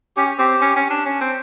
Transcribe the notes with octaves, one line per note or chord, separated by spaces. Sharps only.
C#4 G4
C4 G4
C#4
C#4
D4
C#4
C4